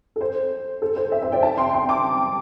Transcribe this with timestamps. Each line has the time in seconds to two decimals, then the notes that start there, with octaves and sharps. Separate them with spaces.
0.16 A4
0.21 C5
0.82 A4
0.96 C5
1.12 C5 E5
1.22 C5 E5
1.32 D5 G5
1.42 E5 A5
1.58 G5 C6
1.73 G5 C6
1.89 A5 D6